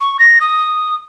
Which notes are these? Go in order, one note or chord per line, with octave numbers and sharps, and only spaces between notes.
C#6
A#6
D#6